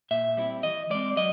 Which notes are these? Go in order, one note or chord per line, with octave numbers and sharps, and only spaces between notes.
A#2 E5
G3 C4 E4
E3 D#5
G#3 C4 D5
F#3 D#5